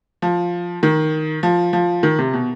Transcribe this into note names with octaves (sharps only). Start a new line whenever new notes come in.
F3
D#3
F3
F3
D#3
C3
B2